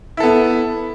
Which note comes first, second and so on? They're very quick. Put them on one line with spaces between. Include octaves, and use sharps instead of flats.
E4 A4 B3